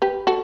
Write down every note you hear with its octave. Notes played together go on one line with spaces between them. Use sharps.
G4 B4
F#4 A4